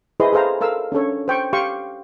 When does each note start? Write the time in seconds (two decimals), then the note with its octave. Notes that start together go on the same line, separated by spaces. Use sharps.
0.20 E4 G#4 B4 C5 D#5 C6
0.33 G#4 A4 C5 F5 A#5
0.61 A4 A#4 F5 E6
0.92 C#4 D4 A4 C#5
1.28 C5 G5 C#6
1.53 G4 F5 G5 C6 C#6